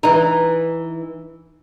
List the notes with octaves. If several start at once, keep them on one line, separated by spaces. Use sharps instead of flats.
E3 D#4